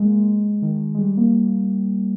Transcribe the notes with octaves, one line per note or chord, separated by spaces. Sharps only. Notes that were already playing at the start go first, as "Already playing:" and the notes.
Already playing: G#3 A#3
D#3
G#3
G3
A#3